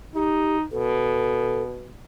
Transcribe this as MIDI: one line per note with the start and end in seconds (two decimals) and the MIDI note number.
0.15 0.64 63
0.15 0.57 67
0.71 1.92 47
0.71 1.63 69